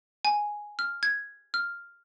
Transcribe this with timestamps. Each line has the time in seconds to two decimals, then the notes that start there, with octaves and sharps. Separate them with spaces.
0.25 G#5
0.79 F6
1.03 G#6
1.54 F6